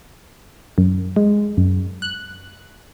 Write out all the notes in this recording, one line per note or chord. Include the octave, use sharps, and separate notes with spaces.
F#2
G#3
F#2
F#6